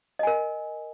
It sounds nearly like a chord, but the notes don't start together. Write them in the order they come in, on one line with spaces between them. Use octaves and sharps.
D#5 G#5 A#4